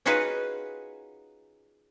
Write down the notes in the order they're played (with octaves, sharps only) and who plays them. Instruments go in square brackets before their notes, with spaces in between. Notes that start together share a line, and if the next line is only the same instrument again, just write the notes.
[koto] C#4 D#4 F4 F#4 G#4 B4